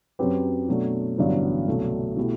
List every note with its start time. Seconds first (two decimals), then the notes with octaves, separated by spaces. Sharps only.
0.19 F#2 F#3 C4 G4 B4
0.68 B2 F#3 A3 D4
1.18 A1 G2 D3 F#3 B3
1.67 C2 B2 F#3 A3
2.17 B2 A3 E4 G4